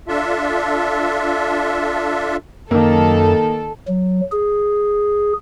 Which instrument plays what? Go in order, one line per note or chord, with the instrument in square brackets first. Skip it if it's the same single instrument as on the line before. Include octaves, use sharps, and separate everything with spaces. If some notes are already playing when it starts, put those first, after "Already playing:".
[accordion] D4 F4 A4 E5
[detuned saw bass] F#2 [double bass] D#3 [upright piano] A#3 [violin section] A4
[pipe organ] F#3
G#4